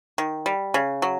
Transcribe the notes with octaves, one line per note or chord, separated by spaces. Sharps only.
D#3
G3
C#3
F#3